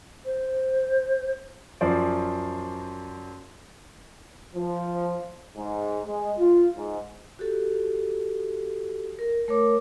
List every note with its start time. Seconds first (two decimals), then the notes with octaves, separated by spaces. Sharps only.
0.25 C5
1.81 F#2 F3 C5 D5
4.56 F3
5.57 G#2
6.07 G#3
6.38 F4
6.77 G#2
7.39 F#4 G4 A4
9.19 A#4
9.48 A3 A#4 C#5 D6